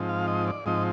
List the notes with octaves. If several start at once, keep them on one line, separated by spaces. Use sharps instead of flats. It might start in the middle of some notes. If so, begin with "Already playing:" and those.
Already playing: G#2 F3 C4 D#4
F5
D#5
D5
G#2 F3 C4 D#4 D#5